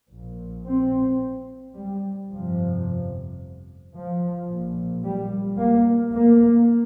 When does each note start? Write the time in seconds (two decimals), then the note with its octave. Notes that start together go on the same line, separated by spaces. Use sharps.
0.11 A#1 A#2
0.66 C4
1.75 G3
2.30 G1 F2 C3 F3
3.95 F3
4.50 A#1 A#2
5.05 G3
5.60 A#3
6.14 A#3